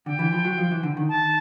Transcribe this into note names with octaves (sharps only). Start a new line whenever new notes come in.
D3 G5
E3
F3
F#3
F3
E3
D3
D#3
A5